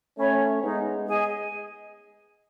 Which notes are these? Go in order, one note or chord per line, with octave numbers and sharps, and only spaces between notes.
A3 C#4 C#5 E5 B5
G#3 B3 D#4
G#4 D#5 G#5